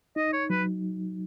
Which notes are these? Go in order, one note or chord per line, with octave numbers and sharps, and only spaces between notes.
D#4 D#5
C#5
F#3 B4